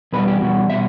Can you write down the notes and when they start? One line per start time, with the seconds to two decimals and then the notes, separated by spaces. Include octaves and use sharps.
0.13 E2 B2 G3 B4
0.27 G4
0.41 E2 B2 G3 F#4
0.70 B2 G3 E5